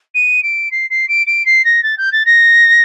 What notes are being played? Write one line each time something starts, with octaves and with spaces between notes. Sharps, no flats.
D#7
D7
C7
C7
D7
D7
C7
A#6
A6
G6
A6
A#6